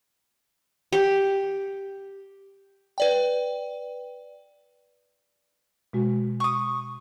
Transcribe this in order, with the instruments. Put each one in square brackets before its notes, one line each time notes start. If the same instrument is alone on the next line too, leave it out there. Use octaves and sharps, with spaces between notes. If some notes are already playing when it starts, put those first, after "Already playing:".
[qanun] G4
[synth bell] B4 D5 G5
[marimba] B2 G#3 F#4
[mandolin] C#6 D#6